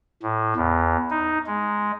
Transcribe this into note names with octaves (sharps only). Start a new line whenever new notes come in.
A2
E2
D#4
G#3